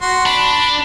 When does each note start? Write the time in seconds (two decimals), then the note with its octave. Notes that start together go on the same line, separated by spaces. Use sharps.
0.01 F#4 C6
0.26 D4 B5